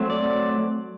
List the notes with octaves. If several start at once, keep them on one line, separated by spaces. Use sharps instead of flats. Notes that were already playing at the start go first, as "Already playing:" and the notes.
Already playing: F#3 A3 C4
D5